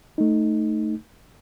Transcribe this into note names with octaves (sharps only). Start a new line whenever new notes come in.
A3 D#4